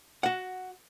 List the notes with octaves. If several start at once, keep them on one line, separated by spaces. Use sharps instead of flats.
F#4 F#5